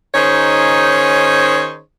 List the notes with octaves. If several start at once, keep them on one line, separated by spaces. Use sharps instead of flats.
D#3 C#4 D#4 G#4 C5 C#5